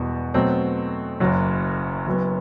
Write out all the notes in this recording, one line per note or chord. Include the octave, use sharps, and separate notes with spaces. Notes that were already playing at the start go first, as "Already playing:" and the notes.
Already playing: E1 E2 B2 G3
B2 F#3 A3 C4
F#1 F#2 F#3
F#1 F#2 F#3 B3